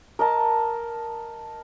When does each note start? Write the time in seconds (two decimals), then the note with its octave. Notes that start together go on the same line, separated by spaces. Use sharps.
0.19 A#4 D#5 A5